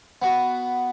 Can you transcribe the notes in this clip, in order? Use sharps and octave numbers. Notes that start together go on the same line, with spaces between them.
B3 F#4